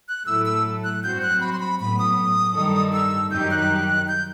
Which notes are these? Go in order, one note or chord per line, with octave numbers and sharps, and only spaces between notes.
F#6
A2 F#3 A3 E4 A4 E6
E6
F#6
G2 F#3 C4 F#4 C5 G6
F#6
B5
C6
B5
A2 F#3 B3 B5
D#6
G2 D#3 G3 D#4 A4
E6
F#2 D#3 G3 D#4 G4 G6
F#6
G6